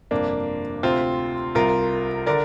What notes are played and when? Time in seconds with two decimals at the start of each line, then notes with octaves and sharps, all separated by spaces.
0.11 G1 F2 C3 A#3 D4
0.83 D2 C3 C4 F4
1.55 C2 C3 F4 A#4
2.26 D3 A#4 D5